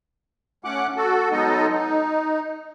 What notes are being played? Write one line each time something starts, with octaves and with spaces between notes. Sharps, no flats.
A3 C#4 F#5 D6 F#6
F#4 A4
F#3 G#3 B3 D#4 A4 D#5
D#4